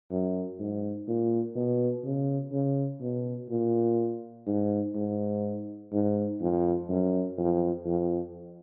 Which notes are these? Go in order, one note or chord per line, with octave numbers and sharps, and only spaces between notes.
F#2
G#2
A#2
B2
C#3
C#3
B2
A#2
G#2
G#2
G#2
F2
F#2
F2
F2